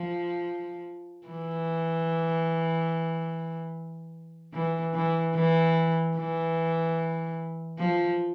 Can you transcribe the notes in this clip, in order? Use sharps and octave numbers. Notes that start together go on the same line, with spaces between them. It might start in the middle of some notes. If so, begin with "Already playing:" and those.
Already playing: F3
E3
E3
E3
E3
E3
F3